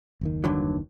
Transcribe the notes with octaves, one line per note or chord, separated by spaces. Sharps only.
F#1 D#2 D#3
G2 D3 F#3